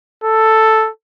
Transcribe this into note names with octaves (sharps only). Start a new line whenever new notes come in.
A4